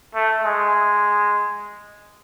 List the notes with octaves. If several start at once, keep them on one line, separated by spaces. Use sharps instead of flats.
A3
G#3